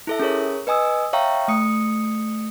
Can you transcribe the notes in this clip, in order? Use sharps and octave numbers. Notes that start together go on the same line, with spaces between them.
E4 A4 E5
C#4 G#4 A#4 C#5
B4 D#5 G#5 D#6 E6
C#5 E5 F5 G5 A#5 C#6
A3 D#6 C#7